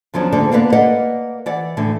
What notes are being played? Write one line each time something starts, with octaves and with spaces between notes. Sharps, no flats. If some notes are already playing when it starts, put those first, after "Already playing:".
E2 F3 F#3 C#4 D4
D2 G#2 D3 A#3 D5
D3 A#3 B3 B4 D5
A#3 A#4 B4 D5 D#5 F#5
E3 D5 F#5
A2 D3 E3